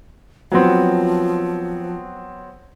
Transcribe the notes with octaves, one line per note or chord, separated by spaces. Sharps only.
F3 F#3 B3 C4